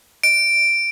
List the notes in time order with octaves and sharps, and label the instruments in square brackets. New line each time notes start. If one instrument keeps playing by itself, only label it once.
[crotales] D7